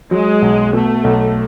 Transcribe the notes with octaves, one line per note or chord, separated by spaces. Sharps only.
F#3 G#3
B1
B2 A3
B1